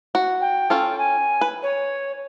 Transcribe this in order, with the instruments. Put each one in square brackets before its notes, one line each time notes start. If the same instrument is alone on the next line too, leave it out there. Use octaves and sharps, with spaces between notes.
[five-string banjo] F#4
[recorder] G5
[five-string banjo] C#4 F4 A4
[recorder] G#5
[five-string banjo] B4
[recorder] C#5